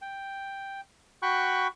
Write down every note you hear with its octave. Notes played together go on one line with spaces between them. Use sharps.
G5
F#4 G5 B5 C#6 F#6